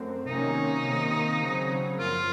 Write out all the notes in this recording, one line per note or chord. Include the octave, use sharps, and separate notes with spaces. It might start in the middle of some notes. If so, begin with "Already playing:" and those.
Already playing: F#2 A3 C4
C3 D#3 F#3 A#3 C#4 D#4
C3 D#3 A#3
C#3 F#3 C4
F#2 F3 A#3 F4